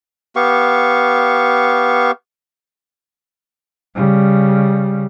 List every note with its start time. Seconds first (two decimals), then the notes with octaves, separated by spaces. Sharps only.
0.36 B3 G4 F5 C#6
3.95 C#3 G3